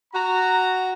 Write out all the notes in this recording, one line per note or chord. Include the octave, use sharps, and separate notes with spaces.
F#4 A#5